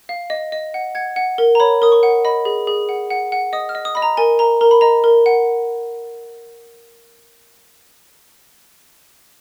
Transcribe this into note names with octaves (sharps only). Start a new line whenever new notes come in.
F5
D#5
D#5
F#5
F#5 G#6
F#5
A#4
A#5
C#5 B5
A#4 D#6
C#6
F#5
D#5 B5
G#4
G#4
F#5
F#5
F#5
D#5 D#6
F6
D#5
D#6
D#5 B5
A#5
A#4 G#5
A#4 A#5
A#4 A#5
B5
D#5 A#5
A#4
F#5